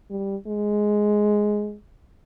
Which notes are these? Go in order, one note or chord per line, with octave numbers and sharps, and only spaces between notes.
G3
G#3